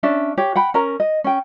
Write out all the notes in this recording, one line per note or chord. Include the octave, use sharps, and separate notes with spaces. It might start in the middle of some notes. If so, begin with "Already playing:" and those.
C#4 D4 E5
G4 C#5
F#5 G5 B5
C#4 A#4 A#5
D#5
C#4 G5